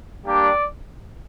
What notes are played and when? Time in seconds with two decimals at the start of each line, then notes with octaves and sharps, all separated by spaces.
0.25 G3 A#3 D4 G4 D5